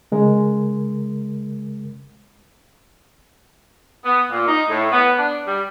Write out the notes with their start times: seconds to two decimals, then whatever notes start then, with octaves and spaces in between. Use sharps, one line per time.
0.12 C#3 G#3 A#4
4.05 B3
4.32 A#2
4.47 D#4
4.70 A2
4.92 B3
5.18 D4
5.47 G3